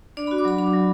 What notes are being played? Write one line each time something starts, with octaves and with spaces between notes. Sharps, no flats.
D4 D5
B5
F#4
D6
F#3 B5
D4 B5
F#3